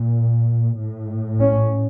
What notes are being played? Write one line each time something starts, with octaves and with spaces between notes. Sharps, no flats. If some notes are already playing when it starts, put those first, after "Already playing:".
Already playing: A#2
A2
C#4